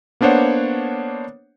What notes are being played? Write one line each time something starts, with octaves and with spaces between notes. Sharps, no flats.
A#3 B3 D4 C5 C#5 F#5